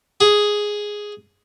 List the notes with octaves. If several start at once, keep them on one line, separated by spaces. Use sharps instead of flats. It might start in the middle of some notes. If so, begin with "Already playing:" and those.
G#4